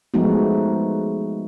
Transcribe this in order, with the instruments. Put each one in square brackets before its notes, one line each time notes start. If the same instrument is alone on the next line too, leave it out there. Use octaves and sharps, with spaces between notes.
[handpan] F3 G#3 A3 B3 D#4 F#4